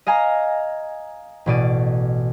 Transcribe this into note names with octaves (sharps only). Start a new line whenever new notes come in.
D#5 F5 G#5 A#5
A1 B2 D5 D#7